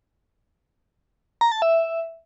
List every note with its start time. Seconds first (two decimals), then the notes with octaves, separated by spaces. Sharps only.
1.41 A#5
1.52 A5
1.62 E5